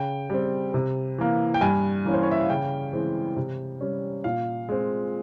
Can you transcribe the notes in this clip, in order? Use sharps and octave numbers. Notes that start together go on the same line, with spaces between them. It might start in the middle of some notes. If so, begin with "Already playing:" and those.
Already playing: C#3 G5
G3 C4
C3
E3 A#3
G5
G2 G#5
E3 A#3 C#4
C5
C#5
E5
F5
C#3 G5
E3 G#3 C4
C3
G3 C#4
A#2 F5
G#3 C4